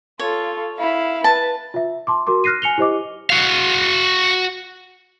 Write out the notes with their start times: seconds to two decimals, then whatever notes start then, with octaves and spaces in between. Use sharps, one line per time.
0.19 F4 A4 C#5
0.76 E4 F5
1.24 B4 A5
1.74 F4 E5
2.07 A5 C6 D6
2.27 F#4 A#4 C6 D6
2.44 F6 F#6 A#6 C7 D#7
2.62 G#5 C#7 F7 G7
2.78 E4 G4 C5 D#5 D6
3.30 F#4 F5